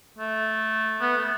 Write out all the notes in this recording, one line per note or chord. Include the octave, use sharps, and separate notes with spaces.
A3
B3
A3